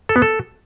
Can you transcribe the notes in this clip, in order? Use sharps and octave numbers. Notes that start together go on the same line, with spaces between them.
A4
B3
A4